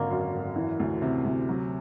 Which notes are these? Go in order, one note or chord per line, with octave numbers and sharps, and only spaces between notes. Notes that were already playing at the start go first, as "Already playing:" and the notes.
Already playing: G#1 D3 A#3
F#2
G#1
E3
D2
C3
D2
F#3